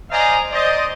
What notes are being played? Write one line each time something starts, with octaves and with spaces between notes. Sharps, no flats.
C5 D5 D#5 F5 G#5 A#5
C5 D5 D#5